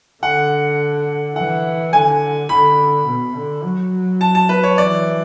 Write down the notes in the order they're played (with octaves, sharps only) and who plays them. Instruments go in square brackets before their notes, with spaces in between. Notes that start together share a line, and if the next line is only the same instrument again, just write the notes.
[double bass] D3 [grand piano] F#5
[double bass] E3 [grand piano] F#5
[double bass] D3 [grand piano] G#5
[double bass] D3 [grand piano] B5
[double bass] B2
D3
F#3
[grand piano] A5
A5
B4
C#5
[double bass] E3 [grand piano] D5